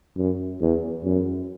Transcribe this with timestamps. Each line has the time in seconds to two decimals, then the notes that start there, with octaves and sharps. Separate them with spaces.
0.17 F#2
0.61 E2
1.05 F#2